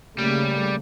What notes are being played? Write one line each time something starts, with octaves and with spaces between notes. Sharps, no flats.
C#3 G3 A3 A#3